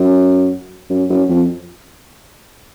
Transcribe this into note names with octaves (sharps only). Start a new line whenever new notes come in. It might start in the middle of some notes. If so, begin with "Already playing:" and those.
Already playing: F#2
F#2
F#2
F2